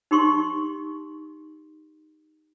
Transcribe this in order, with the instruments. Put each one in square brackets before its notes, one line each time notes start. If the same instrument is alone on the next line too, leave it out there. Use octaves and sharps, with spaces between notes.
[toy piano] D#4 G4 C6 C#6